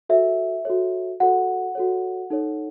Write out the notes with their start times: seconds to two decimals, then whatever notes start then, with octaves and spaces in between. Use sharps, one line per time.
0.09 F#4 A4 C#5 E5
0.65 F#4 A4 C#5
1.20 F#4 A4 C#5 F#5
1.75 F#4 A4 C#5
2.30 D#4 A4 C#5